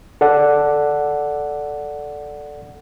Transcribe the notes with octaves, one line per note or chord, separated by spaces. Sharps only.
A4 D5 F#5